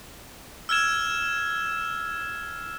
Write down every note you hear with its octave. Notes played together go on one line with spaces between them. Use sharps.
E6 F6 G#6 E7